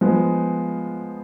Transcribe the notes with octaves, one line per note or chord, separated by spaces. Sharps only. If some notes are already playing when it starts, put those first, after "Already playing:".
F3 G#3 B3